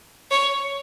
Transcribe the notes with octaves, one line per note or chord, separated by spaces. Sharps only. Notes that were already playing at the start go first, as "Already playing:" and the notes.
C#5